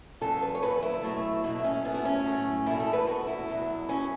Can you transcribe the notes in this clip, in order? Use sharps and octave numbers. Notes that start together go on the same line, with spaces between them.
E2 C#3 F#3 A4
B4
C#5
E2 C#3 F#3 B4
E4
B2 F#3 A3
B2 F#3 A3 E4
C#4
A2 F#3 A3 B3
E4
C#4
A2 F#3 A3
E2 B2 A3 E4
A4
B4
E2 B2 A3 F#4
E4
E2 B2 F#3
B2 F#3 C#4